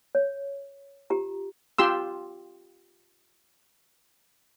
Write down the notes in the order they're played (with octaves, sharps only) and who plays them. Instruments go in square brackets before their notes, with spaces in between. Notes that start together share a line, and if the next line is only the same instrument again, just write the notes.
[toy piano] C#5
F4 G4 A#5
[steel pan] F4 G4 C6 E6